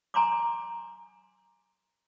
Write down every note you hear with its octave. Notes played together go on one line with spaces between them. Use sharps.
G#5 A#5 C6 D6